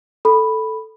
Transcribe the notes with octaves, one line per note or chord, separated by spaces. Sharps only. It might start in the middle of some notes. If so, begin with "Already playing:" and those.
A4 B5